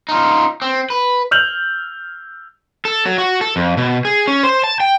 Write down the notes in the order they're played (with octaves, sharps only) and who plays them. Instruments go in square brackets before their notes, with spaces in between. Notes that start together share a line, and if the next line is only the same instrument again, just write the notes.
[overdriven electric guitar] D#4 F4
C4
B4
[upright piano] E6 F6 G6 F7 F#7
[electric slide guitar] A4
F#3
F#4
A4
F2
B2
G#4
C#4
C5
A5
G5